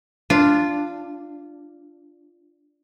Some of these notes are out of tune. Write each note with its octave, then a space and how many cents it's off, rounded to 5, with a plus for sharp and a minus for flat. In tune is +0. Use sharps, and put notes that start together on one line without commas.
D4 +0 F4 -10